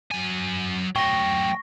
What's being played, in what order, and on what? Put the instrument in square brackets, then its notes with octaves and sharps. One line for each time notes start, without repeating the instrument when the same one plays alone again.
[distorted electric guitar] F#3 G#5
[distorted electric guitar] F#3 A3 [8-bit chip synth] G5 [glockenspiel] C#6 A#6